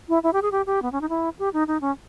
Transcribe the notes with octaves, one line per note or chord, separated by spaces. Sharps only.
E4
E4
G4
G#4
G4
G4
B3
C#4
D#4
E4
G4
D#4
D#4
C#4